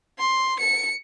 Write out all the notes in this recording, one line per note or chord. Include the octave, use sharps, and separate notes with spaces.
C6
C#7